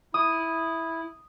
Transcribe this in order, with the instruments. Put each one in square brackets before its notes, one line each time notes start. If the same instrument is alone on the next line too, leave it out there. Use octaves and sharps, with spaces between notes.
[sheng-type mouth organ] E4 [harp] D#6